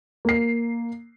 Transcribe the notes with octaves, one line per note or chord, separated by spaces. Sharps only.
A#3 C7